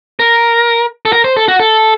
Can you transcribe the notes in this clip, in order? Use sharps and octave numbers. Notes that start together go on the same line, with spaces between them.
A#4
A4
A#4
C5
A4
F#4
A4